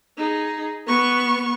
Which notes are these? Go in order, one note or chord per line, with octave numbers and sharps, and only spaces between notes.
D#4 G#4
B3 C#6